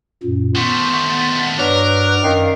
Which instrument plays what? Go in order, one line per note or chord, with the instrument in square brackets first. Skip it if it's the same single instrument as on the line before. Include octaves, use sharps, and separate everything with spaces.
[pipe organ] F#2 A#2
[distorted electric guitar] D#3 A3 [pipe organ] B3 C#6 [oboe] C5
[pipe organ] B3 F#5 A6
[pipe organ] G2 B4 F#6 [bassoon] F#3 [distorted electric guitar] A#4 [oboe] D5
[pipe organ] F#2 F5 [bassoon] D#3